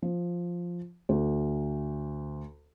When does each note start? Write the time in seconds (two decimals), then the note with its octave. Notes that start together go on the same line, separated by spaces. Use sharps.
0.02 F3
1.09 D2